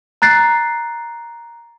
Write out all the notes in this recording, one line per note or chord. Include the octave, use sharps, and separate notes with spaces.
A#5 F#6 A6 C7